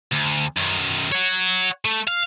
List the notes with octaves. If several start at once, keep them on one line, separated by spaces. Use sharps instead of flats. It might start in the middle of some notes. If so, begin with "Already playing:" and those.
D2
F#2 D#3
C#5 F#5
A3
F5